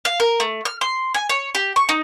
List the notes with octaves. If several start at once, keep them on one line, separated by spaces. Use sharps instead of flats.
F5
A#4
A3
F6
C6
G#5
C#5
G4
C#6
D#4